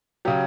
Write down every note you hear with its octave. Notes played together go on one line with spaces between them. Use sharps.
C#3 F#3 G4